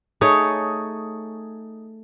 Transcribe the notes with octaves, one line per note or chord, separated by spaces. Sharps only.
A3 D#4 G#4 C#5